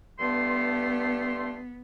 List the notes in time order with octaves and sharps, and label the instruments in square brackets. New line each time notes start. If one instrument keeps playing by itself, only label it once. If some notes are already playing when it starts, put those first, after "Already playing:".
[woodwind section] G2 A3 C6 [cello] B3